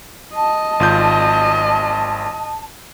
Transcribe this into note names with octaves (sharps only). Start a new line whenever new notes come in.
D#5 A5
G#1 F4 G6